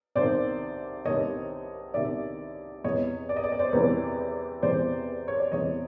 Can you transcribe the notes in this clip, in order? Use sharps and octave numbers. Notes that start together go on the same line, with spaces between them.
C2 C3 D#3 C5 D5
C2 C3 D#3 C#5 D#5
C2 C3 D#3 D5 E5
E2 C3 E3 C#5 D#5
D5
D#5
D5
D#5
C5 D5
E2 C3 E3 B4 C#5
E2 C3 E3 C5 D5
C#5
D5
E2 C3 E3 C#5 D#5